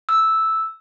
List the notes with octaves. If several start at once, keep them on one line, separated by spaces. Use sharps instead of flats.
E6